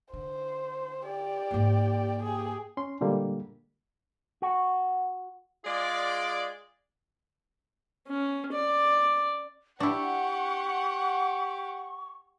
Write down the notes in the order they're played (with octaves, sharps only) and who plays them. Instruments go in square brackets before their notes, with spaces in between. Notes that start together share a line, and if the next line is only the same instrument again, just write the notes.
[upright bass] D3 [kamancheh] C5
[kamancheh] G4 D5
[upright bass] G#2 A#3
[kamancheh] G4 G#4
[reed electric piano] C#4 C6
A#2 D3 G3 G#3 A#3
[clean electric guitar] F#4
[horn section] G#3 F4 G#4 D5
[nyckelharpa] C#4
D5
[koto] D4 E4 [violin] G4 [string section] F#5 [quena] C#6